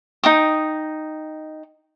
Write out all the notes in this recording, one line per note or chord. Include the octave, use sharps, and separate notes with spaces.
D#4 G5 D#6